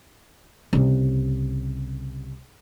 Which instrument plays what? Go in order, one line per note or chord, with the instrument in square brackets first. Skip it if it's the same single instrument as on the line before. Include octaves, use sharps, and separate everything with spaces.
[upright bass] C2 C#3